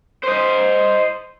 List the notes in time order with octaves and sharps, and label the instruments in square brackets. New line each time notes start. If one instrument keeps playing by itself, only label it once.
[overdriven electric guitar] C5 D#5